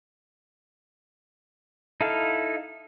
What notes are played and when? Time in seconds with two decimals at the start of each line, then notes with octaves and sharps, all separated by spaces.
2.01 D#4 E4 A4 F5